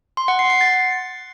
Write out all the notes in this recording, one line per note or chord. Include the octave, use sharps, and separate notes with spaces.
C6
F#5
C7
C7
A6